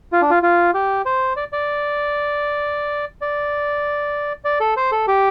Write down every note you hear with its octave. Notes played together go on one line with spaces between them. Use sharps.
F4
D4
F4
F4
G4
C5
D5
D5
D5
D5
A4
C5
A4
G4